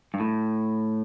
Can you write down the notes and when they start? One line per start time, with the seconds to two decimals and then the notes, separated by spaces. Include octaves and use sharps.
0.14 G2
0.20 A2